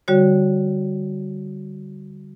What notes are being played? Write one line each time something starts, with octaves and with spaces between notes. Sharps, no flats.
D3 G3 F#4 C#5